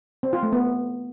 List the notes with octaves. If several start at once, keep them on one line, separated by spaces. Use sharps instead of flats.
C4
F4
A3
B3